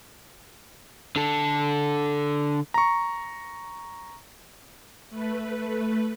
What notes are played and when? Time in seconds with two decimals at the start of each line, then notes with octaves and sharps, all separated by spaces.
1.16 D3 A4
2.74 A#5 C#6
5.09 A3 B4